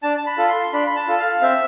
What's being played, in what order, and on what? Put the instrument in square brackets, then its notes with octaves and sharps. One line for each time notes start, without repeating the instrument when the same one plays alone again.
[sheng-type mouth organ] D4 A5
A5
B5
F4 A4
C6
D4 B5
B5
A5
F4 A4
F5
C4 E5